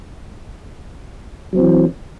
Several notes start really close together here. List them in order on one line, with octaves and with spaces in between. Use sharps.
F#3 C4 E3